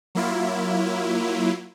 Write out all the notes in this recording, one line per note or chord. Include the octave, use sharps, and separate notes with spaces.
F#3 A#3 E4 F4